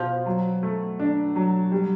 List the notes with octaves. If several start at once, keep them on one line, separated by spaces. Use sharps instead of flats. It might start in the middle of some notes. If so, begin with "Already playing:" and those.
Already playing: B2 F3
F#3
A3
D4
F#3
G3